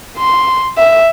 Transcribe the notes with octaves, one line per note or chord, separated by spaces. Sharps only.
C6
E5